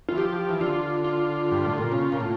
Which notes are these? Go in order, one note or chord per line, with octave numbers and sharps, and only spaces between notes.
E3 F4
F3 G4
E3
D3 F4
F4
G2
A2
A#2
C#3
A#2
A2